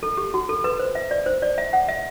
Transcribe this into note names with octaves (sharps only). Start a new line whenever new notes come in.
A4
G4
F#4
A4
B4
C5
E5
D5
C5
D5
E5
F#5
E5